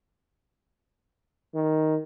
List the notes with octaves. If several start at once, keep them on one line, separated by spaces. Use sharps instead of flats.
D#3